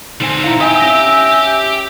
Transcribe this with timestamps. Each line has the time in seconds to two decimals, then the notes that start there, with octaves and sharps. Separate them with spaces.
0.21 D3 C4 D#4 G#5
0.44 E4 F5 A#5
0.61 G4 E5 G5 G#5
0.80 C#4 A#6